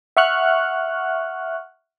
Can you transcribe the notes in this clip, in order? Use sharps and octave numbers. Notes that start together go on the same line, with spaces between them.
E5 F#5 C#6 F6 F#6